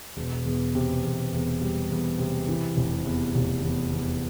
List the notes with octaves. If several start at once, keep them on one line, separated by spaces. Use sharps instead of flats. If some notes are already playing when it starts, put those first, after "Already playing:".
E1
E2
C3
E2
E2
G3
E2
C3
E3
F1
E2
F1
E2
E2